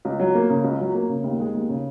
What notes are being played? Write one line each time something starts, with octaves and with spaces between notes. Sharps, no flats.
C#2
F#3
A#3
C#3
C#2
F#3
A#3
C#3
D#2
G#3
D#2
C#3